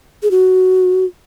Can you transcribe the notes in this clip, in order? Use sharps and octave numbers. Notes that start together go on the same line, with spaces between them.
G#4
F#4